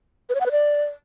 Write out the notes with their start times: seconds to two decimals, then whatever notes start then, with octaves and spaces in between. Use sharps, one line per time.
0.29 B4
0.35 C#5
0.40 F#5
0.46 B4
0.51 D5